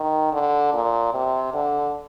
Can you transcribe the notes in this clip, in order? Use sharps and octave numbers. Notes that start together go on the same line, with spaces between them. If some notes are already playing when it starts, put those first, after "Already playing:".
Already playing: D#3
D3
A#2
C3
D3